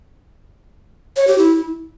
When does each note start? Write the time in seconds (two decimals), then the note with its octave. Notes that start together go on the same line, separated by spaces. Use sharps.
1.16 C#5
1.27 G4
1.38 E4